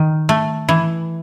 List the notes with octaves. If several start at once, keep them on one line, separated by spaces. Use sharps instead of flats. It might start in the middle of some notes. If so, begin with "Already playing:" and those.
Already playing: D#3
A3
E3